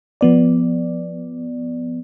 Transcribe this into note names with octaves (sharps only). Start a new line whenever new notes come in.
F3 B3 D5